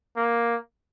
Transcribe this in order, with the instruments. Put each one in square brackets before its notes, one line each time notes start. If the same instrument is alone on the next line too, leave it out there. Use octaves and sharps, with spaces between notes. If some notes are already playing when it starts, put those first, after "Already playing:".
[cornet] A#3